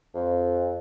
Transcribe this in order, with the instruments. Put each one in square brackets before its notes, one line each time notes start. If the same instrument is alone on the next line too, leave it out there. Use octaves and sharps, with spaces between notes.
[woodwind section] F2